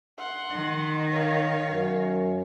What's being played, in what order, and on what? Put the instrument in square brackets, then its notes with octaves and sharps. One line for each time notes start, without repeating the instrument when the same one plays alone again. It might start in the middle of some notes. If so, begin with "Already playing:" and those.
[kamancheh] F#5 C6
[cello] D#3
[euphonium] A#4 [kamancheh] C#5 F5
[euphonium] F#2